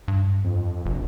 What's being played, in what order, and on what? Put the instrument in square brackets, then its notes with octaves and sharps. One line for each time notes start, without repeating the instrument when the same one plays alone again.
[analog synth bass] G2
[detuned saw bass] F2
[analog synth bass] F1 [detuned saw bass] A#1